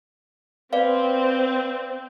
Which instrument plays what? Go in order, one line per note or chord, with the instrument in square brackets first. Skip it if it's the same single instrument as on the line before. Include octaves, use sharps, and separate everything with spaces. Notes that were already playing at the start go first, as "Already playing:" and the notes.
[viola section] C4 [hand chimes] B4 D5 F5